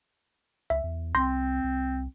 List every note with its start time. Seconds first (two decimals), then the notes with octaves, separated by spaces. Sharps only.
0.70 C#2 E5
0.84 E2
1.15 C2 C4 C6 G6 A#6
1.64 C2